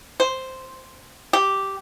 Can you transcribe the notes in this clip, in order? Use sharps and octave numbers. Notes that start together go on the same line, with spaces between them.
C5
G4